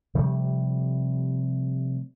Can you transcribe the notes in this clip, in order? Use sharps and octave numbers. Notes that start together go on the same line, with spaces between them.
C3 F3 G3 A3